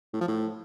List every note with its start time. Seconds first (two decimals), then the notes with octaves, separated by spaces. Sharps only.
0.13 A2
0.21 F3
0.28 A2